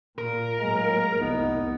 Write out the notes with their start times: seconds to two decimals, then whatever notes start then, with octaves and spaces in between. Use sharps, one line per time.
0.18 A#2 A#4
0.59 A2 F#3 G#3 A#3 A#5
1.20 F1 C2 B3 D#4